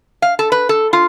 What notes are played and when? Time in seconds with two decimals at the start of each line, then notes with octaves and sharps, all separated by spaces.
0.22 F5
0.39 A4
0.52 B4
0.69 A4
0.93 F4